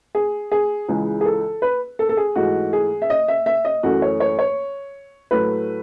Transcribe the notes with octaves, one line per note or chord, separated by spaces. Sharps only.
G#4
G#4
C#2 C#3 E3 G#3
G#4
A4
B4
A4
A4
G#4
G#2 E3 A3 F#4
G#4
E5
D#5
E5
E5
D#5
F#2 E3 A3 F#4
C#5
C#5
C#5
A2 F#3 A3 B4